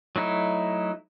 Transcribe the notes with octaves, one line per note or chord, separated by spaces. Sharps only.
F#3 A3 D#4 E4